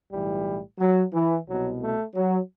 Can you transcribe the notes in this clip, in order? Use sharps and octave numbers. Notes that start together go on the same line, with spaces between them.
B1 A2 E3 G3
F#3
E3
C2 B2 F#3
A3
F#3